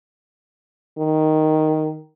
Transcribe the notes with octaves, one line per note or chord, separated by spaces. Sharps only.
D#3